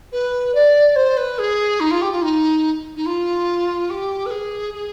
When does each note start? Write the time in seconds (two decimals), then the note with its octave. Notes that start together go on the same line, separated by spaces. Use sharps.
0.12 B4
0.54 D5
0.95 C5
1.17 B4
1.38 G#4
1.80 D#4
1.90 F4
2.01 G4
2.11 F4
2.22 D#4
2.96 D#4
3.05 F4
3.89 G4
4.25 B4
4.31 G#4
4.73 G#4